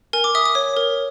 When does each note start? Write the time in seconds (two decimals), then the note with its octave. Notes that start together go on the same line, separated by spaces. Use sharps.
0.13 A#4 G#5
0.24 D6
0.35 E5 D#6
0.46 D#6
0.55 C#5
0.77 A#4